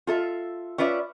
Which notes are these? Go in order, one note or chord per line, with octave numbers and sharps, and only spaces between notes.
F4 A4 E5
C#4 F4 B4 D5 E5